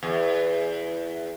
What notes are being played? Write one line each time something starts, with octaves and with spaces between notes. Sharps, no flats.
E2